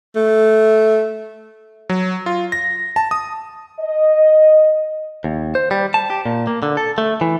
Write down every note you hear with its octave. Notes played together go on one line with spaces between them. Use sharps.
A3
F#3
F4
A#6
A5
D#6
D#5
D#2
C5
G3
A5
G4
A#2
A#3
D3
A4
A3
E3